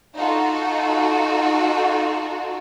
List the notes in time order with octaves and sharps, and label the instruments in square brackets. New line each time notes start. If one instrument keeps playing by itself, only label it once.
[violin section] D#4 F4 F#4 A4